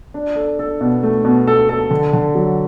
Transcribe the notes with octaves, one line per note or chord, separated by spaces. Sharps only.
D4
A4
A4
B2
A3
B2
A4
A4
D3
D3
F#3